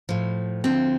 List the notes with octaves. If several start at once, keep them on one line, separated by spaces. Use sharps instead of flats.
A2 F3
D2 D3 F3 C4